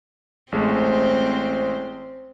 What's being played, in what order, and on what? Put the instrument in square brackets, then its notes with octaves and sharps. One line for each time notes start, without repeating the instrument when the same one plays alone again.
[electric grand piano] A1 G#3 A3 [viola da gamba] C4 C5